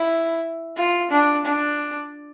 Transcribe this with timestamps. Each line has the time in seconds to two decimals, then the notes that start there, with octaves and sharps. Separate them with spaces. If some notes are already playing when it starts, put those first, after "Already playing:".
Already playing: E4
0.77 F4
1.11 D4
1.45 D4